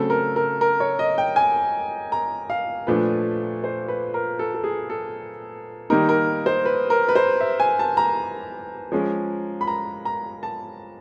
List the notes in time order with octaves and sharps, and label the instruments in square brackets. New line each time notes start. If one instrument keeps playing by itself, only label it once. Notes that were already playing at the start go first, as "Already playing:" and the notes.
Already playing: [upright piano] C#3 F#3 A3 C4 A4
A#4
A#4
A#4
C#5
D#5
G5
G#5
A#5
F5
A#2 F3 A3 D4 B4
C5
B4
A#4
A4
A4
G#4
A4
D#3 G3 A#3 D#4 A#4
A#4
C5
B4
A#4
B4
C5
E5
G#5
A5
A#5
F3 G#3 C#4
B5
A#5
A#5
A5